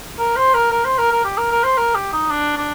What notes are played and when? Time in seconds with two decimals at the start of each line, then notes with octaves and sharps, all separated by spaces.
0.18 A#4
0.36 C5
0.54 A#4
0.71 A#4
0.85 C5
0.98 A#4
1.12 A#4
1.25 G4
1.38 A#4
1.51 A#4
1.64 C5
1.77 A#4
1.95 G4
2.13 D#4
2.30 D4
2.57 D4